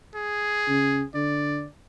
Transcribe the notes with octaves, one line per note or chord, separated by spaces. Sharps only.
G#4
C#3
D3 D5